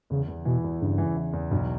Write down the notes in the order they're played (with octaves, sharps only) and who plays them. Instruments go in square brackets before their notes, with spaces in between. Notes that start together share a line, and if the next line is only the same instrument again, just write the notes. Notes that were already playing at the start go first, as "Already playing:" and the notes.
[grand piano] E2 [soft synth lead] C#3
[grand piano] E2
[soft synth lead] B2 [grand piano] E3
[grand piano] E2
[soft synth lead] G2 [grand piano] C#3
[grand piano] E3
E3
E2
[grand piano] B1 [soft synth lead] G2